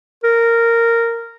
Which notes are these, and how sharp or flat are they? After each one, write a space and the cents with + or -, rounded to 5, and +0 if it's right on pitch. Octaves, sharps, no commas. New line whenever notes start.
A#4 -10